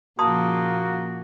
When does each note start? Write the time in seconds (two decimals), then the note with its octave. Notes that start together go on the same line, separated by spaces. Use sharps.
0.19 A#2 C#3 F3 A#3 F#4 A5 C6 D#6